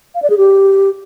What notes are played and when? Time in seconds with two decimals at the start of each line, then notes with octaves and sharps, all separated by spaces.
0.15 F5
0.22 D5
0.30 G#4
0.38 G4